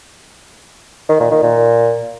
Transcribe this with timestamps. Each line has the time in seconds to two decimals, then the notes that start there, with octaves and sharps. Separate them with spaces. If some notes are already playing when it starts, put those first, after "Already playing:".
1.09 D#3
1.20 A#2
1.31 D#3
1.43 A#2